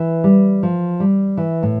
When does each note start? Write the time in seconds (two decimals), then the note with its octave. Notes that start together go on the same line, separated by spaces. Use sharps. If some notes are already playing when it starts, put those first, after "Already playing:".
Already playing: E3
0.24 G3
0.63 F3
1.00 G3
1.37 E3
1.63 A2